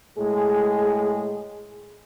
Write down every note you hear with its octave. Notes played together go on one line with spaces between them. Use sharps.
A2 G#3 G#4